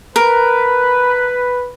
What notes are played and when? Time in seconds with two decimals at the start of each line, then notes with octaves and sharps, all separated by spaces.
0.16 A#4 B4